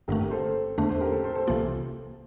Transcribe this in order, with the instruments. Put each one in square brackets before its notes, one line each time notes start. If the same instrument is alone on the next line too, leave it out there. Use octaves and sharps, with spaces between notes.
[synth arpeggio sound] G1 G2 D3 A3 [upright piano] G4 A#4
[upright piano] G4 A#4
A4 C5
[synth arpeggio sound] E2 D3 A3 D4 [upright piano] A4 C5
[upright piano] A4 C5
G4 A#4
A4 C5
A4 C5
A4 C5
[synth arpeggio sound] C2 C3 E3 A#3 F4